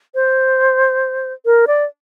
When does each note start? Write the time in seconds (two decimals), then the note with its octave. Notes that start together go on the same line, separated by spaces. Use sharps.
0.15 C5
1.46 A#4
1.67 D5